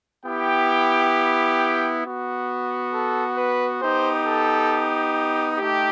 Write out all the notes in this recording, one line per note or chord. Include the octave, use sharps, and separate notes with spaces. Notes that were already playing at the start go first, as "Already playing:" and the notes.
B3 E4 G4 G5
G5
B3 F#4
A4
B4
B3 D#4 G4 C5
A4
A3 D#4 G4